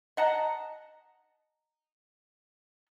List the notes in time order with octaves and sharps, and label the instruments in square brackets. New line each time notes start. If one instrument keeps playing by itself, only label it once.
[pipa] D#5 F#5 A5 A#5